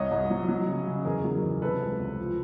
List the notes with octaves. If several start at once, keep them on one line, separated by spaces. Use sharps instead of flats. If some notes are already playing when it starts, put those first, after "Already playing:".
Already playing: C2 C#5 D#5
C2
F#3
F#3
C#3
C#3
E2 G#4 A#4
F#3
E2
C3 A4 B4
C#2
C#2
F3